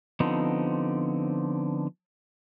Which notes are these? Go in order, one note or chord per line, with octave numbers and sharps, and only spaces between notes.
D3 F3 B3 C4 D#4